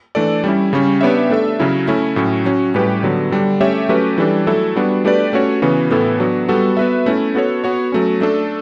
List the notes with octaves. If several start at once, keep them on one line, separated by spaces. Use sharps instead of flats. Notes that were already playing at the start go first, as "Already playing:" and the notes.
E3 A3 D4 A4 D5
G3 C#4 E4
C#3 G3 C#4
B3 D4 G4 C#5 E5
A3 D4 A4 E5
C#3 F#3 C#4 E4
A3 C#4 E4
A2 F#3 C#4
F#3 C#4 F#4
A2 G3 C#4 G4 B4
D3 F#3 B3
D3 G3 D4
A3 C#4 G4 C#5 E5
F#3 A3 C#4 G4 B4
E3 G3 D4 A4
F#3 A3 E4 A4
G3 B3 D4 F#4
A3 D4 G4 B4 D5
A3 C#4 F#4 C#5
C#3 E3 B3 F#4
A2 E3 B3 E4 A4
F#3 B3 D4 F#4
G3 B3 F#4 A4
B3 F#4 B4 E5
A3 C#4 E4
B3 F#4 A4 C#5
B3 F#4 C#5
F#3 A3 C#4
A3 D4 A4